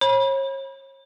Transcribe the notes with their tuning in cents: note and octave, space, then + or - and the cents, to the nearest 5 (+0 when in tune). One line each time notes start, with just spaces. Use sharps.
C#5 -40 B5 -30